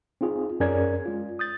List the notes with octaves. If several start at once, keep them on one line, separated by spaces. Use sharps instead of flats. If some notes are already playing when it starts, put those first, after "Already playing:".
C4 D#4 F4 G#4
F#2 C#4 G#4 A#4 D5 G#6
G#3 F4
D#6 G6 A6